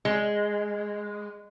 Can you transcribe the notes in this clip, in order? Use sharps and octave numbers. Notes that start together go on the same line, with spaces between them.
G#3